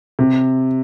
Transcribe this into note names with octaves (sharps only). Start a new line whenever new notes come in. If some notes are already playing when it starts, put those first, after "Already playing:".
C3